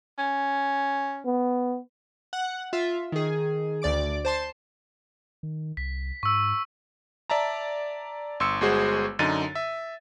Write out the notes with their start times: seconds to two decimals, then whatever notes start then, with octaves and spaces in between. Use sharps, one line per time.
0.18 C#4
1.26 B3
2.33 F#5
2.73 F4 E5
3.12 D#3 G#4
3.82 D2 D5 D6 D7
4.25 C5 A5 C6
5.43 D#3
5.77 C2 B6
6.23 G#2 C#6 E6
7.30 D5 E5 A5 A#5
8.40 G1 C6 E6 C#7
8.61 G1 G#3 F#4 G#4 C5
9.19 F#2 D3 D#4 A6 D#7
9.55 E5